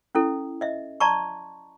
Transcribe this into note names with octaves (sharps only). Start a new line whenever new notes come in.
C#4 E4 A4
D#5 E5
D5 A5 A#5 C6 C#6